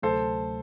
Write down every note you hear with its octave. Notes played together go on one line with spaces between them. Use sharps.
D2 C3 F#3 A3 A4 C5